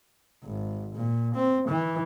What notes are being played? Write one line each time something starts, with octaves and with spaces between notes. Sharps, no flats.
G#1
A#2
C4
E3